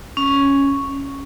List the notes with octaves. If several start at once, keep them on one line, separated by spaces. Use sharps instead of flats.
C#4